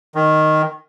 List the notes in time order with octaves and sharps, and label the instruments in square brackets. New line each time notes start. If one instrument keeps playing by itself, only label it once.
[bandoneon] D#3